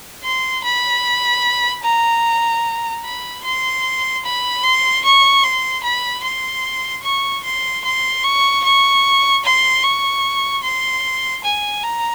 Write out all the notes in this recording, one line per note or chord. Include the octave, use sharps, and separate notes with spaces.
C6
B5
A#5
B5
C6
B5
C6
C#6
C6
B5
C6
C#6
C6
C6
C#6
C#6
C6
C#6
C6
G#5
A#5